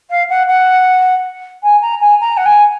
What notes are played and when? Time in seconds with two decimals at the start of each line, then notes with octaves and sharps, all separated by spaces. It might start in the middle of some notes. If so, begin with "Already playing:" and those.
0.10 F5
0.29 F#5
0.47 F#5
1.63 G#5
1.81 A#5
2.01 G#5
2.20 A#5
2.37 F#5
2.45 G#5